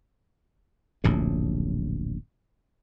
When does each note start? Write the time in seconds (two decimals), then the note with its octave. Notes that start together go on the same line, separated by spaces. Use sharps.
1.04 D1 A#1 F#2 A2